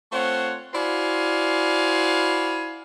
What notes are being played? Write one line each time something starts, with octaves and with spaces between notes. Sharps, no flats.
A3 C4 F4 C5 C#5 F#5
E4 F#4 C5 D5 F5 G#5